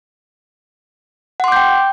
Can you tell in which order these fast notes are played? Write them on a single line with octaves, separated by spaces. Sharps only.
F#5 C6 D6 G6 G5